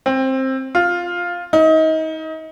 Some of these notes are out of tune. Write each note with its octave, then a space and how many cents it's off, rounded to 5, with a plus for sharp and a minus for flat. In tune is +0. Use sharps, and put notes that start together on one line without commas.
C4 +15
F4 +5
D#4 +30